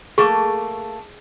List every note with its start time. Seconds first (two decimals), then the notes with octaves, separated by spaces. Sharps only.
0.18 A3 A#3 G#4 C#6